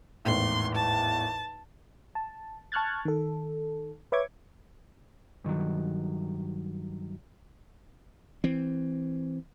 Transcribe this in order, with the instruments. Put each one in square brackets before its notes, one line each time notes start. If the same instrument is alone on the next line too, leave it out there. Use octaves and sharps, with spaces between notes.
[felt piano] G#1 E2 A2 [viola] C6
[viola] A5
[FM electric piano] A5
A5 C#6 F6 F#6 G#6 A6
D#3 A4
B4 C#5 E5 C#6 D6 G#6
[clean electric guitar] G2 D#3 F3 F#3
[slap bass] E3 C4